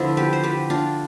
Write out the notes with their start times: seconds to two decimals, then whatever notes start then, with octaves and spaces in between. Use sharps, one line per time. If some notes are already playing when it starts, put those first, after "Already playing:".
Already playing: D3 F3 B3 E4
0.17 G4 B4
0.33 C5
0.44 G4 B4
0.70 D4 F4